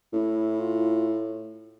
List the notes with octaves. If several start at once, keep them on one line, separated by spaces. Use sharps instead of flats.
A2 E4
F4